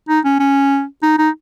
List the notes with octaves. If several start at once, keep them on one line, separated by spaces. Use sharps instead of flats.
D#4
C#4
C#4
D#4
D#4